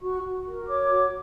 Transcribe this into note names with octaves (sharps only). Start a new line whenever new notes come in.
F#4 C#6
F#4
A#4
C#5 D6
F#4